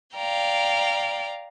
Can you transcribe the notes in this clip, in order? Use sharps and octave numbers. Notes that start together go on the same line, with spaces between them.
D5 F5 G5 A#5